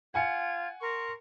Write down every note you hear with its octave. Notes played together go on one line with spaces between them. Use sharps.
F4 F#5 G#5 G#6 C#7
A#4 C6 C#6